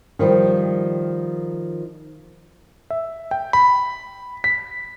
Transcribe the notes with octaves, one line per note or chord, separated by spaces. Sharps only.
D#3 F3 G3
E5
G5
B5
B6